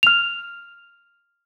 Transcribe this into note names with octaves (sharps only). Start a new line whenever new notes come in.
F6 F7